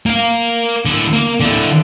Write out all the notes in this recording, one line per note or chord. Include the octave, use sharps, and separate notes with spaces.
A#3 F5
D3 E4
A#3
D3 E4